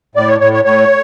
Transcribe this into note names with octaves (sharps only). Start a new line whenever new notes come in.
A2 D5
C#5
A2 C#5
C#5
A2 C#5